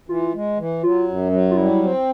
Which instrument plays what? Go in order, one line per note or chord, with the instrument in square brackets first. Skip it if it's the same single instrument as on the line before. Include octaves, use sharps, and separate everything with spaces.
[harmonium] E3 [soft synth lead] F4
[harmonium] G#3
E3
[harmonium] F#3 [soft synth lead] F4
[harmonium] F#2
F#3
[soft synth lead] F4
[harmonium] G3 [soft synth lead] E4
[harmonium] C4